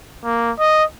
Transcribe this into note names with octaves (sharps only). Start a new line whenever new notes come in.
A#3
D#5